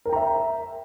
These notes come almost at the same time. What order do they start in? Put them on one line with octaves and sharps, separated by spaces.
A#4 G5 A#5 E5